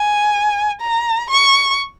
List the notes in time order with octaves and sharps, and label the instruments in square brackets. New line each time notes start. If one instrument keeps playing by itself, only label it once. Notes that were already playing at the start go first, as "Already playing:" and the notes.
Already playing: [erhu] G#5
A#5
C#6